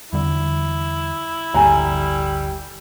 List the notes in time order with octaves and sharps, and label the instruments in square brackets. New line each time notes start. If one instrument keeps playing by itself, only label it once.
[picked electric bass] E2 D3 G3 [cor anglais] E4
[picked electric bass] D1 G1 D2 [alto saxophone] G3 [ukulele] A4 G#5 A#5